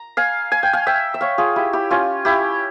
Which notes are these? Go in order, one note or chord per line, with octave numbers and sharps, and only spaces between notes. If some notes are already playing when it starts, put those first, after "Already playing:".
Already playing: A#5
F5 G#5
G#5
G5
F5 G#5
E5 G5
E5
C#5 F5
F4 G#4
E4 G4
E4 G4
C#4 F4
E4 G4